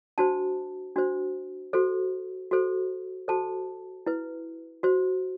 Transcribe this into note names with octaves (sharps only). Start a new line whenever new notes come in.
D4 F#4 C5 A5
D4 F#4 C5
F#4 A4 C5
F#4 A4 C5
F#4 A4 C5 A5
E4 B4
F#4 C5